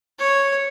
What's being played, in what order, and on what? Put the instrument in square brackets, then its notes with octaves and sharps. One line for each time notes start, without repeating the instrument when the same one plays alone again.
[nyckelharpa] C#5